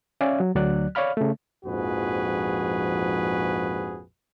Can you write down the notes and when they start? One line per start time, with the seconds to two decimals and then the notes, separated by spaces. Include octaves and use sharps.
0.21 C#4 D5 E5 F5 G#5
0.40 F#3
0.55 D2 F#3 D5 F#6
0.95 C#5 D5 F5 B5 F6
1.17 C#3 A3
1.65 A#1 F2 G#2 F#4 G#4 B4